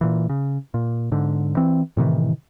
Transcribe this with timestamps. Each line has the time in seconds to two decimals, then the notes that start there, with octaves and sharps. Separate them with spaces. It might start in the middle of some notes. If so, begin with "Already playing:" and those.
0.01 A#2 E3
0.29 C#3
0.74 A#2
1.12 G#2 D3
1.57 E3 C4
1.97 A2 C3 D#3 E3